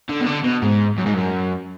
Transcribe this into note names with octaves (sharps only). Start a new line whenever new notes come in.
D3
B2
D3
B2
G#2
F#2
G#2
F#2